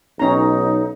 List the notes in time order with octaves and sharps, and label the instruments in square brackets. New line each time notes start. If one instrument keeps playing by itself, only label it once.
[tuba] B1 [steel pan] C#4 A#5 [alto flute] D#4